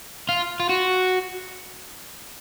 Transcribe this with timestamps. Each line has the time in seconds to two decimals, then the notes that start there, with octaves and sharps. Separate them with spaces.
0.29 F4
0.60 F4
0.70 F#4